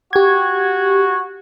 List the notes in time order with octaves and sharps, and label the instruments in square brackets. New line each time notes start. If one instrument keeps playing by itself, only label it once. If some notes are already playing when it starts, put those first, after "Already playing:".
[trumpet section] F#4 [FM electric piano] G4 G#6